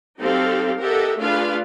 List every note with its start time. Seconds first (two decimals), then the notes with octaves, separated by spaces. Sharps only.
0.19 F#3 C4 D#4 G4 A4 F5
0.80 G4 A4 A#4 D#5 E5 F#5
1.18 A3 D4 F4 G#4 B4 F5